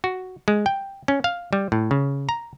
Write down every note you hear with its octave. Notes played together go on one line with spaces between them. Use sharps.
F#4
G#3
G5
C#4
F5
G3
A2
C#3
A#5